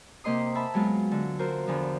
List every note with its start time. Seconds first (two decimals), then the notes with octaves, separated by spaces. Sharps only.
0.24 C3 A#3 D#5 C6 D#6
0.55 E5 A5 B5
0.74 F#3 G#3 B3 F4
1.11 D3
1.39 F4 F#4 A#4 C5
1.67 E2 D3 F3